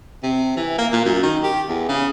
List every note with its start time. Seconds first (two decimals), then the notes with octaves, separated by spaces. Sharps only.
0.23 C3
0.57 E3
0.78 A#3
0.92 A#2
1.05 F#2
1.23 D#3
1.43 G4
1.68 E2
1.89 C#3